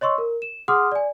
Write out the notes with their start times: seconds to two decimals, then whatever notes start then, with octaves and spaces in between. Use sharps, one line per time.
0.01 C#5 D#5 C6 C#6 E6
0.18 A#4
0.42 E7
0.68 G#4 F#5 C6 D6 D#6 F6
0.92 D5 G#5